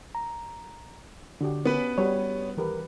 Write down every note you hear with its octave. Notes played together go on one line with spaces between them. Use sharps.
A#5
D3 D4 F#4 G4
B3 C#4 B4
G3 F#4 C#5
D#2 E3 G4 A#4 B4